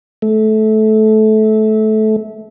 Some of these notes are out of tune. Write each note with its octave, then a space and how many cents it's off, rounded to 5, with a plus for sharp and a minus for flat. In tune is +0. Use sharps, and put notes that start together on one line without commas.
A3 -20